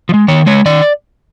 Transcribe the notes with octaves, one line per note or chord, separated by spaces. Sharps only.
F3
G#3
D#3 C#5
G#3 C#5
D#3 D5